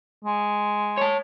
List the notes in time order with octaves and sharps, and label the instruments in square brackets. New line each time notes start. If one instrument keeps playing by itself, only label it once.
[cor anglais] G#3
[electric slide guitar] C#5 A5